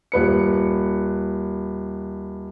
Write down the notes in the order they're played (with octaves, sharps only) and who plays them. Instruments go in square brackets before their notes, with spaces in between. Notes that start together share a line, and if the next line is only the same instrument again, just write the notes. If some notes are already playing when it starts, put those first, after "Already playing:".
[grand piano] D#1 B4 C#7